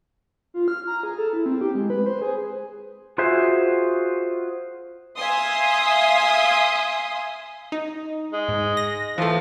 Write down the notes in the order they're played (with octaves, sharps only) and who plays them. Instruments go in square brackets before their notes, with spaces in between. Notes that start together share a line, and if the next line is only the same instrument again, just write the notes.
[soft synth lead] F4
F6
A#5
G#4
A4
E4
C4
G4
G#3
B4
C5
G#4
[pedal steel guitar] F4 F#4 G#4 C5 E5
[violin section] E5 F5 G#5 C6 D#6
[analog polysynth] D#4
[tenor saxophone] G#3
[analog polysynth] G#2
A#6
[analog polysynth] E3 A3 [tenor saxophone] F3